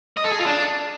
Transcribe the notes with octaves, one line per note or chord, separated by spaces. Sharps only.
D#5
A4
G#4
F4
D4